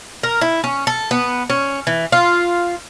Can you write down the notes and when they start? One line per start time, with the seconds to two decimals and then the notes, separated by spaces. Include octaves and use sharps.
0.23 A#4
0.41 E4
0.64 C#4
0.87 A4
1.11 B3
1.50 C#4
1.87 E3
2.12 F4